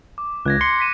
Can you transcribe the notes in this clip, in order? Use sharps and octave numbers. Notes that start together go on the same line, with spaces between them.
D6
C#2 F#6 G#6 A#6
C6 C#7
B6 D#7 E7